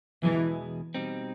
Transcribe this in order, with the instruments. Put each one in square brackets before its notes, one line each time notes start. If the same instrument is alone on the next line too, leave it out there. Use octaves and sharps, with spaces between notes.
[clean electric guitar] E2 B2 G#3 [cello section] E3
[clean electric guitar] B2 G3 C4 D#4